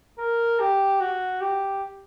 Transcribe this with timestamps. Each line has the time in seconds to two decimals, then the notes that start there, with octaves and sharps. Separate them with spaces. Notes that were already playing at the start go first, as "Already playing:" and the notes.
0.18 A#4
0.60 G4
1.00 F#4
1.41 G4